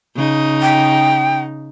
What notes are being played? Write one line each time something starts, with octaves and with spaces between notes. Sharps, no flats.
C#3 D#4
G5